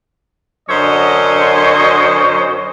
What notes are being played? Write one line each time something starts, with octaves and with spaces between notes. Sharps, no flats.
F#2 D3 C5 C#5 D#5